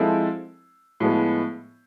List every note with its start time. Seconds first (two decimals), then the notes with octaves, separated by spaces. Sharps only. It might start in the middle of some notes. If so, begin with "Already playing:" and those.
Already playing: F3 G#3 C4 E4 A4
1.00 A2 F3 G#3 B3